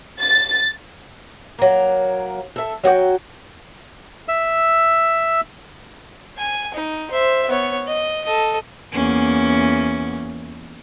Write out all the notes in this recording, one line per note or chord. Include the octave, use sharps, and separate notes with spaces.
A6
F#3 A#3
A4 E5
F#3 F#4 D5 G5
E5 E6
G#5
D#4
C5 E5
B3 C#5
D#5
A4 D#5
E2 A#3 C#4